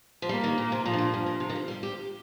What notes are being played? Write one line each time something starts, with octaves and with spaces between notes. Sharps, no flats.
F3
G3 A#3
D#3
A#2
C3
A#2 F3
G2
A#2
G2
A#2
C3
D#3
F3
G3
G4